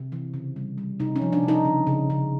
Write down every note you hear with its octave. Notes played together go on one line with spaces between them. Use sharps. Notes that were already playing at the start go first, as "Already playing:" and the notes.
Already playing: C3
E3
C#3
G3
G3
C3 D#4
C#4
F3
D4
C3
D#4
C#3
C#3
C#3